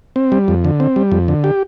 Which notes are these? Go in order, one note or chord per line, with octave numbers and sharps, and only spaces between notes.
C4
G3
F2
D3
C4
G3
F2
D3
G4